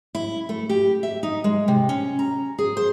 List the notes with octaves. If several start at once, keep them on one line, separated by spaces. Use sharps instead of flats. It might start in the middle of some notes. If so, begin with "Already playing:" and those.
E4
A3
G4
E5
D#4
G#3
C3
C#4
A#5
G#4
C5